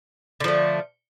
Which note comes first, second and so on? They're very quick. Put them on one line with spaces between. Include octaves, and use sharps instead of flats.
D3 F3 A3